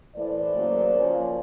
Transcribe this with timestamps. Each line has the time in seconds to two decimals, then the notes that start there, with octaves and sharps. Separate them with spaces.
0.16 A2 E3 A3 C5 D5
0.56 C#3 F#3 A#3
0.95 F3 A#3 C#4